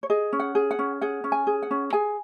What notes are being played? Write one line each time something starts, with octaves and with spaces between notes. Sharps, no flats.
C#5
G#4 D#5
C#4
F#5
G#4
F#5
C#4
G#4 F#5
C#4
G#5
G#4
F#5
C#4
G#4 G#5